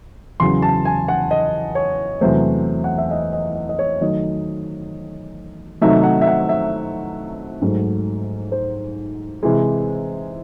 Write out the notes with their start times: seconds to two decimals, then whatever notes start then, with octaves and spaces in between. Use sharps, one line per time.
0.40 E2 C#3 F#3 C6
0.62 A5
0.85 G#5
1.08 F#5
1.31 D#5
1.75 C#5
2.21 E2 C3 F#3 A3 C5
2.84 F#5
2.98 E5
3.11 D#5
3.33 D#5
3.55 D#5
3.69 D#5
3.79 C#5
4.01 D#3 F#3 A3 D#5
5.81 C3 D#3 F#3 A3 D#4 E5
6.03 F#5
6.22 E5
6.27 F#5
6.49 E5
7.61 G#2 F#3 A3
8.52 C5
9.43 C3 E3 G#3